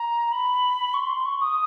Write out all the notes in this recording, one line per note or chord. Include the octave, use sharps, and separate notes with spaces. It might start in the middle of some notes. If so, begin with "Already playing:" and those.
Already playing: A#5
B5
C#6
C6
C#6
D#6